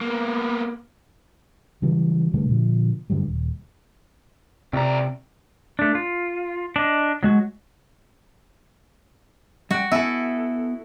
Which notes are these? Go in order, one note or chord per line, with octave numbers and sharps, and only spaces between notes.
A#3 B3
C#3 E3 F#3 G3
B2 D3 G3 A3
A#2 D3 F3
G2 D3 F#3 G3
D#1
C#2 C3 D5 A#5
A3 D4
F4
D4 D#5
F#3 G#3 F#4
G3 F#4 G5
B3 E4 A4 G#5